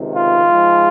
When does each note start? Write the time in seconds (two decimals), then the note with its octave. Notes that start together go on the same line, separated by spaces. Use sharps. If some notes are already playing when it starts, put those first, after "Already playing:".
Already playing: C#2 C3 D#3
0.15 F4
0.47 G#2 F3 G#3